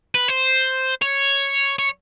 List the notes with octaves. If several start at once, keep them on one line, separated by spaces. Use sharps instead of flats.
B4
C5
C#5
C#5